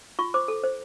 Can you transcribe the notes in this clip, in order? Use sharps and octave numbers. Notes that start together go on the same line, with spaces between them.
F4 C#6
C5 D6
A4
C5